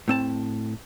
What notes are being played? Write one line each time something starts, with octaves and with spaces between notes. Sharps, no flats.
A2 C4 A5